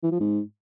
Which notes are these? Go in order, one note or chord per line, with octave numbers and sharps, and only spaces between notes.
E3
F3
G#2